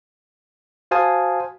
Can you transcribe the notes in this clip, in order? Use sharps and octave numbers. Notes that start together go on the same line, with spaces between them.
F#4 C5 F5 G#5 A5 D#6